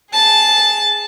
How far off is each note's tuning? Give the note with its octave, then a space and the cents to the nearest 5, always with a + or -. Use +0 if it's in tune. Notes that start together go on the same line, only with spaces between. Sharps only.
G#4 +0 A5 -5